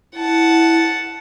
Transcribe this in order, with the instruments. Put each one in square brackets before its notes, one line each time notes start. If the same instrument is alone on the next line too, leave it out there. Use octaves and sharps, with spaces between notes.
[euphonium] E4 [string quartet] F#5 A5